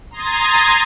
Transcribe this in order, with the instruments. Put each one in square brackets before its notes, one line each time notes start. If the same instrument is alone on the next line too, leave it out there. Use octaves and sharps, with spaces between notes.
[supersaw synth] A#5 C6 D#6 G#6 A6